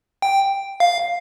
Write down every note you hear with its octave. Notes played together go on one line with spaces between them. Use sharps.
G5
F5